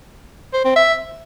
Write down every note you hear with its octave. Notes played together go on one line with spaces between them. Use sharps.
C5
C4
E5